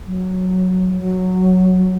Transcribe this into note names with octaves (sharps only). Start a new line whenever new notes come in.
F#3
F#3